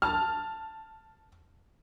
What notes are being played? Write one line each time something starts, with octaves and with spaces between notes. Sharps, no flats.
A5 F6